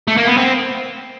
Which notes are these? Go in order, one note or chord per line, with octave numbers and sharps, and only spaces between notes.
A3
A#3
B3
C4